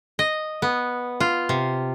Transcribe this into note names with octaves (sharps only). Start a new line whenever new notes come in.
D#5
B3
F4
C3